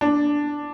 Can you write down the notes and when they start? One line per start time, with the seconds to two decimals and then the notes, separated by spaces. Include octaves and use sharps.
0.01 D4